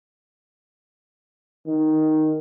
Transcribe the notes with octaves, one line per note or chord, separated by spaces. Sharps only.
D#3